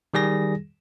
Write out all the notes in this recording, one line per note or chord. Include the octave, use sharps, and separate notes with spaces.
D#3 G3 G#4 A#6